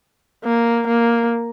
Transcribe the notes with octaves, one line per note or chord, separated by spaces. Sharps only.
A#3
A#3